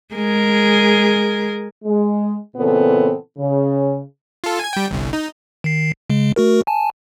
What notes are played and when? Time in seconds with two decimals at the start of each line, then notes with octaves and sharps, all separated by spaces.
0.14 G#3 G#4 A#4
1.84 G#3
2.57 A#2 C#3 E3 B3 C4 A4
3.37 C#3
4.44 F4 A4
4.59 G#5 G#6
4.73 G3 G5
4.91 G1 C2
5.13 D#4
5.64 D#3 C7
6.10 C#3 G#3
6.36 A3 F#4 A#4
6.67 G#5 A5